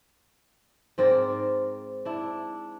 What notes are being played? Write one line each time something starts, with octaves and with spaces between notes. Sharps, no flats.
G#2 C4 A#4 D5
D4 E4